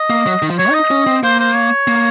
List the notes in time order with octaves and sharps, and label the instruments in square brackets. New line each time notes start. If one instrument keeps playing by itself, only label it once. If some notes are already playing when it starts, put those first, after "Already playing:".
Already playing: [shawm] D#5
[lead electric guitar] A#3
F#3
D#3
F3
[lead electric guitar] F#3 [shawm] C#5
[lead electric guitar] D#4
[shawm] D#5
[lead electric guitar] C#4
C4
[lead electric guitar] A#3 [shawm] C5
[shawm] C5
C#5
[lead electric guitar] A#3